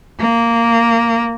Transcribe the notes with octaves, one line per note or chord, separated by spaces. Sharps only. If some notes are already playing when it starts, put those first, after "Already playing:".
A#3